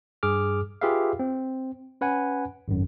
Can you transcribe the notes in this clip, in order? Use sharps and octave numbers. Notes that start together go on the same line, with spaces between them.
G2 G#4 D6 F6
F4 G4 G#4 B4 E5 F5
C4
C#4 B4 F#5 G#5
G#1 F#2